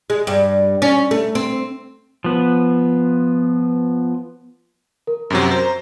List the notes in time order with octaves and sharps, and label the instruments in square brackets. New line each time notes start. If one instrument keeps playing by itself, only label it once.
[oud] G#3
G2
C#4
A3
C4
[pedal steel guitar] F3 B3
[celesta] A#4
[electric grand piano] F#2 C3 F#3
C5 A#5